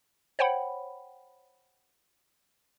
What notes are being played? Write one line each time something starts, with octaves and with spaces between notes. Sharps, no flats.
C5 C#5 F#5 G5 B5